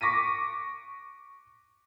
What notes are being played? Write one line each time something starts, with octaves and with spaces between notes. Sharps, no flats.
C#6 D6 A#6 B6 D#7